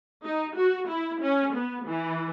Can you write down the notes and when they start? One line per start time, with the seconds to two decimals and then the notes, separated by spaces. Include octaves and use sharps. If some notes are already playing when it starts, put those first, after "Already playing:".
0.24 D#4
0.56 F#4
0.88 E4
1.21 C#4
1.55 B3
1.86 E3